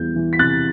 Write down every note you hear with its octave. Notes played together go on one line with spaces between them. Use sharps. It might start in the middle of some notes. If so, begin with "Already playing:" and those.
Already playing: E2 E3 G3 G6
E3
B6
C3 F#6 A6